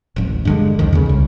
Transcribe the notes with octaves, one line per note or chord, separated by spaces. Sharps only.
D1 A1
G2 D3 G#3
C2 F2 D3 D#3
D#2 C#3
C2